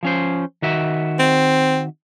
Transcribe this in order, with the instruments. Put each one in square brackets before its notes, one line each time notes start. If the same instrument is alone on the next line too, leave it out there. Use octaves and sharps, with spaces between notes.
[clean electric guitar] F3 C#4 C5
D#3 F#4 E5
[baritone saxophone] C4